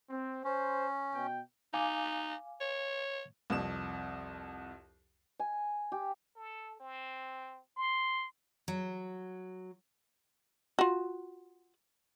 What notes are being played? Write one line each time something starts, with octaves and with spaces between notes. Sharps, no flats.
C4
C#4 C5
B2 G5
D#4 F5 G#5 D6
C#5
C2 F2 E7
G#5
G4
A4
C4
C6
F#3
F4 F#4